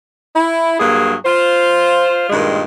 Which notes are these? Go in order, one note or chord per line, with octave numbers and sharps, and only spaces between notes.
E4
G2 F#3 A#3 G#4
F4 C5
G2 A#2 D#3 G#3